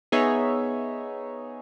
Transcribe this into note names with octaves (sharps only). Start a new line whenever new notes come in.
B3 D#4 G#4 C#5 E5